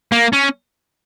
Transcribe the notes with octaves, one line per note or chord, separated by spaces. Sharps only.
A#3
C#4